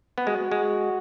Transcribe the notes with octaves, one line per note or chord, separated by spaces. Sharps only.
B3
G#3 F#4
G#3